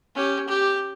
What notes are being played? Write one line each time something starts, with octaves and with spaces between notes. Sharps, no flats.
C#4 G4
G4